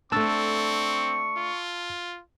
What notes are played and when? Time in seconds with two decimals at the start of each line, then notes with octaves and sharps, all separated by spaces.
0.12 A3 C4 D4 A5 C#6 E6 A6
1.37 F4